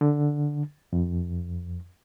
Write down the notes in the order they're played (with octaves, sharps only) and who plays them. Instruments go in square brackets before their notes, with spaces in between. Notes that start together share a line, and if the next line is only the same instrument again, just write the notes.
[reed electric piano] D3
F2